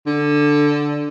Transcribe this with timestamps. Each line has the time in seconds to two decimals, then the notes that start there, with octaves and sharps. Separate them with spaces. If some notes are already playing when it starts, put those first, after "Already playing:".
0.07 D3